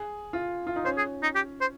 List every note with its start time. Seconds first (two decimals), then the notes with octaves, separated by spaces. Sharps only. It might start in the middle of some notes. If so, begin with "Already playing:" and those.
Already playing: G#4
0.33 F4
0.67 F4
0.76 D#4
0.85 C#4 C5
0.98 G#4
1.23 D#4
1.35 G4
1.61 C5